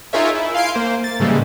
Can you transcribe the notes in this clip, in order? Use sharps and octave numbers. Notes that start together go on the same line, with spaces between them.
D#4 F4 G#4 A#4 C#5 E5
E4
F5 G#5 C6 C7 D7
A#3 C5
A6
A2 C#3 E3 G3 G#3 A#3